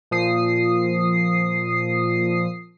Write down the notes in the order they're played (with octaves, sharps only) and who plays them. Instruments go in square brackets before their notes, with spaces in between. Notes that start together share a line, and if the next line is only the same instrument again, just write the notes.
[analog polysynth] A#2 F3 D#6 C7